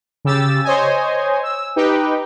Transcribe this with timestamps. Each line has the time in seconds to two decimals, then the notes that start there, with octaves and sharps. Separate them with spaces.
0.25 C#3 G4 E6 A6
0.64 C5 C#5 D#5 G#5
1.43 E6
1.76 D#4 G4 B4 G5